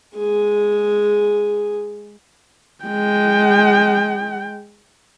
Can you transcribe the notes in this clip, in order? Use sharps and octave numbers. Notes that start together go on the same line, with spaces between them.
G#3 G#4
G#3 G5